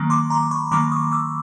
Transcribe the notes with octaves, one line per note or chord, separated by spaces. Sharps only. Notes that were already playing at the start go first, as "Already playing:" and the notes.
Already playing: D#3 F#3 A#3
C6 D6
A#5 C6
B5 C#6
D#3 F#3 A#3 C6 D6
C#6 D#6
D6 E6